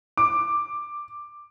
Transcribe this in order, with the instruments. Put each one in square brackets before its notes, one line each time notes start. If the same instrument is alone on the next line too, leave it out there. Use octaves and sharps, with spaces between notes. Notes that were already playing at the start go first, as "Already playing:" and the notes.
[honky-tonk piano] D6